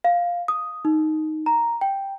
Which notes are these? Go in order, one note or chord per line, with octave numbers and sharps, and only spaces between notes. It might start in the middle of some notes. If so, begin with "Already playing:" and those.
F5
D#6
D#4
A#5
G5